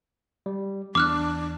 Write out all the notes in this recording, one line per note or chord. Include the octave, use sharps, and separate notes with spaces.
G3
E2 D4 D6 F6 F#6